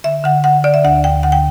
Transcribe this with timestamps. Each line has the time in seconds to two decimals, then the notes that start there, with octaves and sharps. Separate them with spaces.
0.04 D3 E5
0.24 D3 F#5
0.44 D3 F#5
0.64 D3 D5
0.74 E5
0.84 D2 F#5
1.04 D2 G5
1.23 D3 F#5
1.32 G5